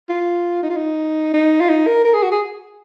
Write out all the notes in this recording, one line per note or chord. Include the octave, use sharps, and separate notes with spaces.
F4
D#4
F4
D#4
D#4
F4
D#4
A#4
A#4
G#4
F#4
G#4